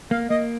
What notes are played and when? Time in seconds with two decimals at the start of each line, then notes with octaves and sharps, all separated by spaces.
0.11 A#3 F5
0.30 A#3 D#5